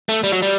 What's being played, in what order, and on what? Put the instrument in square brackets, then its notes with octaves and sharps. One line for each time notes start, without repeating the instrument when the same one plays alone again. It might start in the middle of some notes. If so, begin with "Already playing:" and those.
[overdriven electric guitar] A3
G3
F#3
G3